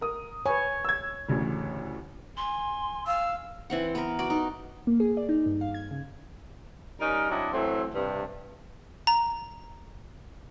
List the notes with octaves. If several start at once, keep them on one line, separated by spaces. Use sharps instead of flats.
A#4 D#6
B4 C#5 G#5
E6 G#6
A1 D2 C#3
G#5 C6
F5 E6
E3 C4 F#5
B3 A#4
F#4 D5
D#4
A#3
G#4
D5
D#4
G2
F5
G#6
C#3
G3 C#4 D#4 A#4
F#3 C4 D4 E4 D#5
E3 F#3 A3 C4
G2 C3
A#5